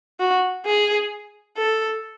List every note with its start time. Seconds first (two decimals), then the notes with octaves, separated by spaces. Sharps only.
0.20 F#4
0.66 G#4
1.57 A4